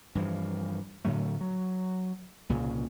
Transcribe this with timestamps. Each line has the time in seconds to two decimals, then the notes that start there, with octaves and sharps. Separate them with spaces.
0.15 G2 E3 F3
1.05 A2 D3 F#3 A3
1.41 F#3
2.49 C2 A#2 C#3